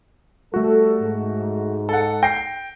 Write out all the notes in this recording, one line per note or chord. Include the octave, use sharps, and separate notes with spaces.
G3 A3 F#4 A4
G#2
A4 F#5
G5 A#6 C7